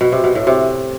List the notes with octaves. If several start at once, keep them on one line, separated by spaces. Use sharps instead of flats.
B2
C3
B2
A2
C3